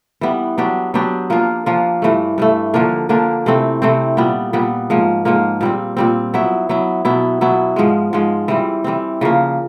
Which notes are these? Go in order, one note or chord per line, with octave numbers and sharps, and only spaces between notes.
E3 G3 B3
F#3 B3 D4 G4
F#3 B3 D4 G4
F3 A#3 D4 F4
F3 A#3 D4 F4
G2 E3 A3
G2 E3 A3
D3 F3 A#3 D4
D3 F3 A#3 D4
C3 E3 A3 C4
C3 E3 A3 C4
A#2 G3 B3
A#2 G3 B3
G#2 F3 A#3
G#2 F3 A#3
A#2 G3 C4
A#2 G3 C4
F#3 B3 E4
F#3 B3 E4
B2 F#3 B3 E4
B2 F#3 B3 E4
G#2 F3 G#3
G#2 F3 G#3
E3 G3 C4
E3 G3 C4
C#3 F3 A#3